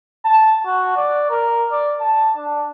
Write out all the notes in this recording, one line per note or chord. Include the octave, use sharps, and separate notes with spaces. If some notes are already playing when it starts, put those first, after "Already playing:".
A5
F#4
D5
A#4
D5
A5
D4